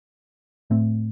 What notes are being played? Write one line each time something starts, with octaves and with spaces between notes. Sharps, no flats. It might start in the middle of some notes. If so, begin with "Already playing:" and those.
A2 A3 C4